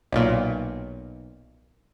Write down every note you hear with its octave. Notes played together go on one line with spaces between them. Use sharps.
B1 A#2